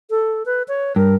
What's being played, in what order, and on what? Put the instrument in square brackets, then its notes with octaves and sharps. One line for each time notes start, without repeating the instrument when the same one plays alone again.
[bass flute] A4
B4
C#5
[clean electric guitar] G2 [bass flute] A#4